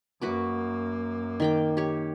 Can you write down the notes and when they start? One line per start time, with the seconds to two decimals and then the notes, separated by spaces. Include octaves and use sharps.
0.21 F#2 A#3 F#4 B4 D6
1.40 D#3 G5 D6
1.77 G4 C#5